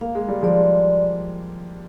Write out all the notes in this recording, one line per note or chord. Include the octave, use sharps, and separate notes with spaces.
A#3 F5
G#3
G3
F3 G#3 D5